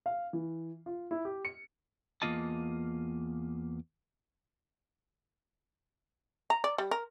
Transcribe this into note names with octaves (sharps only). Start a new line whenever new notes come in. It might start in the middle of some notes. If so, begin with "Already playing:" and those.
F5
E3
F4
E4
G4
C#7
E2 A3 A#3 F4 D#5 A5
A#5
D5
G3
A#4